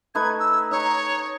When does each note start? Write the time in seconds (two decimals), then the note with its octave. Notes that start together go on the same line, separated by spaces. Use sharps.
0.15 A3 D#4 B4 G#6
0.40 E6
0.71 D#4 C#5 A#5